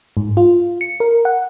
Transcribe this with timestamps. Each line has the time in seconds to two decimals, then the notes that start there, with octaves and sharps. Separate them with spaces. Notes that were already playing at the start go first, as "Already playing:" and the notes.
0.17 G#2
0.37 F4
0.81 C#7
1.00 A#4
1.25 F#5